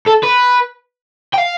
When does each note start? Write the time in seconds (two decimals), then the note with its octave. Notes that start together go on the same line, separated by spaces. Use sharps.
0.07 A4
0.24 B4
1.34 G5
1.38 F5